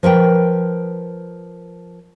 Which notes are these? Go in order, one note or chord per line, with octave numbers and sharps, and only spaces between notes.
F3 A#4 B4 G5